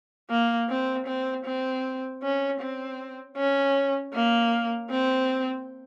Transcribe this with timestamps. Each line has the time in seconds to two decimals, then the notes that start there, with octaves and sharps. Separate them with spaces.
0.30 A#3
0.69 C4
1.07 C4
1.45 C4
2.23 C#4
2.60 C4
3.37 C#4
4.14 A#3
4.90 C4